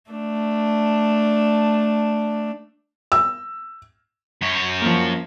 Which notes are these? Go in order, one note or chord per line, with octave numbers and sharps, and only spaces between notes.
A3 D4
E6
F#2 C#5
F3 A#3